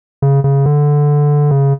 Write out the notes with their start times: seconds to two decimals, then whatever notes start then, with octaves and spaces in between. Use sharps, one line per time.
0.22 C#3
0.44 C#3
0.66 D3
1.51 C#3